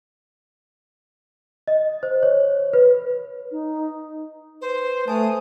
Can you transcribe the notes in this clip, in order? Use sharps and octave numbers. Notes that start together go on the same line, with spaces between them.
D#5
C5
C#5
B4
D#4
B4 C5
A3 C5 G#5 A5 D#6